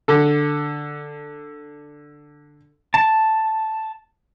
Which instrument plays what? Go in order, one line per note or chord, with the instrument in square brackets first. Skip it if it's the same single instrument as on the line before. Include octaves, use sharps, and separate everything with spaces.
[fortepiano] D3 A4
[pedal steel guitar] A5